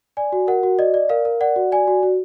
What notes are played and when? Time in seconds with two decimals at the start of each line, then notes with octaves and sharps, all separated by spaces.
0.17 D5 G#5
0.32 F#4
0.47 A#4 F#5
0.63 F#4
0.79 D5 D#5
0.94 D5
1.09 A#4 F5
1.25 A#4
1.41 D5 F#5
1.56 F#4
1.72 D5 G#5
1.88 F#4
2.03 F#4